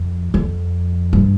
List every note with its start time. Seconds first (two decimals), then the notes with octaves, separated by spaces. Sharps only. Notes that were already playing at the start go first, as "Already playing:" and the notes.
Already playing: F2
0.34 F2
1.13 G2